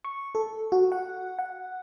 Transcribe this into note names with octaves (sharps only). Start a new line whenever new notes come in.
C#6
A4
F#4
F#5
F#5